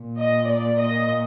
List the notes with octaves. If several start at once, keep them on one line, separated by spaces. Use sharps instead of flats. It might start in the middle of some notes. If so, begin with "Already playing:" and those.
Already playing: A#2
D#5
D5
D#5